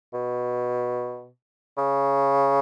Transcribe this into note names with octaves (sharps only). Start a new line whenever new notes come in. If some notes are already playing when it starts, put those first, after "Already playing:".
B2
C#3